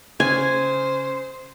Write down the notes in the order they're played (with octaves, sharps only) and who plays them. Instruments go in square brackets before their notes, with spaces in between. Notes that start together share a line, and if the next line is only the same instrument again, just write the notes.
[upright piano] C#3 [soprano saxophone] C5 [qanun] G#5